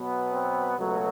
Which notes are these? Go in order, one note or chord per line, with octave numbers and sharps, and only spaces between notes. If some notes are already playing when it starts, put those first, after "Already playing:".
Already playing: B2 F#3 B3
C4
C#2 B2 F#3 A3